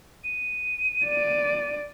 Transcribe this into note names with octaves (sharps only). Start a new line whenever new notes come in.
D#7
D5